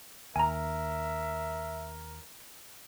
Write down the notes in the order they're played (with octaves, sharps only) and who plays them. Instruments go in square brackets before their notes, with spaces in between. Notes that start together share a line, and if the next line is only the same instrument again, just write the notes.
[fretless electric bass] D#2 [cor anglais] A#4 [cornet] E5 [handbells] G#5 A#5